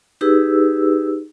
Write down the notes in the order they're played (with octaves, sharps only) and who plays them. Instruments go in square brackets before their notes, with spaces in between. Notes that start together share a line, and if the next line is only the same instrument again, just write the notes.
[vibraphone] D#4 G4 G#4 B4 E6